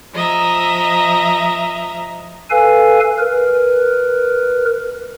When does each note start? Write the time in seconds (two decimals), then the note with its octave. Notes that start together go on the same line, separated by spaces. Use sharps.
0.13 F3 D#5 E5 A#5
2.50 A4 B4 F5 G#5
3.18 A#4 B4